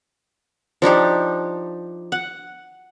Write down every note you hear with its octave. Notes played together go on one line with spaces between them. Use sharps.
F3 D4 D#4 G4
F#5